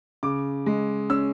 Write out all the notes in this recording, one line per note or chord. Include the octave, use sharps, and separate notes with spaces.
C#3 D6
G#3
C#4 E6